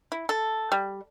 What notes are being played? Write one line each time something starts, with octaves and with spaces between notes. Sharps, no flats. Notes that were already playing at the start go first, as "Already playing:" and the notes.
E4
A4
G3